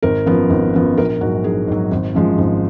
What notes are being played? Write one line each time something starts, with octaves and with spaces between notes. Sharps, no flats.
G#1 A#4
F#2 F3 B3
G#1
F#2 F3 B3
A#1 A#4
G#2 F#3 F#4
A#1 G#4
G#2 F#3
G#1
F#2 F3 G#3
G#1